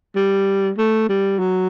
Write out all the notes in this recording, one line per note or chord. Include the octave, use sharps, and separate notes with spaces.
G3
A3
G3
F#3